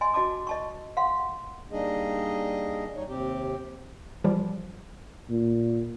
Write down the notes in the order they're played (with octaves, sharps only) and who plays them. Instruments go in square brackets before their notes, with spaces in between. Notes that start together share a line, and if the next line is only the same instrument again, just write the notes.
[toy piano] D#5 G#5 C6
F#4 D#5 A5 D6
D#5 A5 C#6
F5 F#5 C6
[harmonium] G3 A#3 D4 D#4 G#4 D#5
G3 D#4 C#5
D#2 C3 C4 G4
[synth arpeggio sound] E3 F3 G3
[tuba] A#2